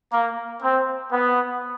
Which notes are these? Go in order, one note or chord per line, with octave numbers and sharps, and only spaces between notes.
A#3
C4
B3